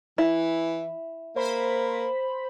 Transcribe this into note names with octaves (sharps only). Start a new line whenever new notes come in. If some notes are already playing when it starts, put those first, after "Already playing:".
E3 E4
A#3 C5 B5